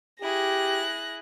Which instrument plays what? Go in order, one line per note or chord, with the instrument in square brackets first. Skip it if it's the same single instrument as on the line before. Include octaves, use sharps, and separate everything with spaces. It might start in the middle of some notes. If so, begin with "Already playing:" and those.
[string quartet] E4 G#4 [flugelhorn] G4 [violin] F#6 A#6